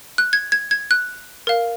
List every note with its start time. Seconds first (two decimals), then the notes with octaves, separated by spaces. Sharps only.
0.18 F#6
0.33 G#6
0.52 G#6
0.71 G#6
0.91 F#6
1.47 A#4 F5